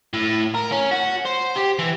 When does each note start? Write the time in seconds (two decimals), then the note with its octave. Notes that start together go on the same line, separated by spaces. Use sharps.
0.13 A2
0.54 A#4
0.71 C#4
0.91 F#4
1.25 C5
1.56 G4
1.79 E3